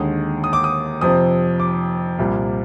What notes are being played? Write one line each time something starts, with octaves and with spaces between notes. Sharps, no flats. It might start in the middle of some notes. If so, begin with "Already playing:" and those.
Already playing: D#2 D3 G#3 D#6
D#6
D6
D#6
F2 C3 F3 D#6
D6
C2 A#2 G3